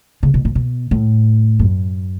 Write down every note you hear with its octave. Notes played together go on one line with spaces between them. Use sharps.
C#3
B2
A2
B2
A2
F#2